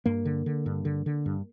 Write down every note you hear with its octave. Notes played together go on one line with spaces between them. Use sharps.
G2 A#3
D3
D3
G2
D3
D3
G2